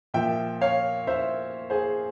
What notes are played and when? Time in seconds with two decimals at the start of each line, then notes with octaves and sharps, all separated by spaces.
0.14 A#2 F3 E5 G5
0.61 C#5 F5
1.07 C5 E5
1.70 G#4 C5